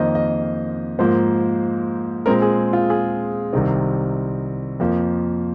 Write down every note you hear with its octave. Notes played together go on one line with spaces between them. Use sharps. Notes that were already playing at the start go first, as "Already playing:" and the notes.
Already playing: F2 D#3 A#3 C5 D#5
D#5
G#2 F3 A#3 C5
A#2 G#3 C4 A#4
G#4
F4
G#4
C2 C3 D#3 C4
F2 F3 A#3